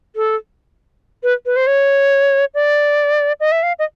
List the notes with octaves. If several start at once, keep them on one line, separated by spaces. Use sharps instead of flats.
A4
B4
B4
C5
C#5
D5
D#5
E5
F5
D#5